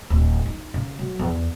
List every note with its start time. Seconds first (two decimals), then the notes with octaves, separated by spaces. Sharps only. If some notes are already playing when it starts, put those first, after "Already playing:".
0.10 D1
0.46 D#4
0.74 C#3
0.99 F#3
1.19 E2